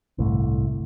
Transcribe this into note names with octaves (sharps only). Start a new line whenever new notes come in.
G1 C2 A2